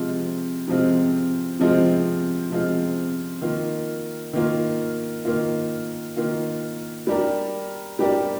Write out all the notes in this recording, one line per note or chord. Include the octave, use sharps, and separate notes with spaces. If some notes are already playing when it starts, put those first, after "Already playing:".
Already playing: C3 F3 G#3 C4 F4
C3 F3 G#3 C4 F4
C3 F3 G#3 C4 F4
C3 F3 G#3 C4 F4
D#3 A#3 F4
D#3 A#3 F4
D#3 A#3 F4
D#3 A#3 F4
G3 D4 G4 A#4 D5
G3 D4 G4 A#4 D5